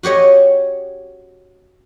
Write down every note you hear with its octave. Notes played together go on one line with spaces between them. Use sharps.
F#4 G4 C#5 D#5